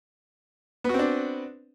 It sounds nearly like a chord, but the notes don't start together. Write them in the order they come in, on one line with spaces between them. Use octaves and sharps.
B3 F#4 C4 D4